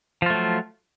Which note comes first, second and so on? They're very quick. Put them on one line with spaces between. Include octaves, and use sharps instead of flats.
F3 F4 A3 F#3